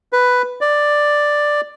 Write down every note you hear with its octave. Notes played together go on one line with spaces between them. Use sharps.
B4
D5